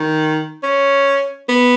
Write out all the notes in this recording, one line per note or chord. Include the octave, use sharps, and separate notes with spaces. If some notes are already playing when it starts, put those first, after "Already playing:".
Already playing: D#3
C#4
B3